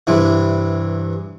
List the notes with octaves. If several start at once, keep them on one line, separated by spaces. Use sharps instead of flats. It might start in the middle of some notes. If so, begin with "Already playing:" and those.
G2 C3 E3